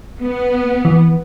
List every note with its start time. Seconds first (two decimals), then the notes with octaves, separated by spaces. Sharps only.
0.20 B3
0.85 E3